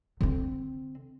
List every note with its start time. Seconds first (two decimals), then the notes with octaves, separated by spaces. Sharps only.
0.21 D3 C4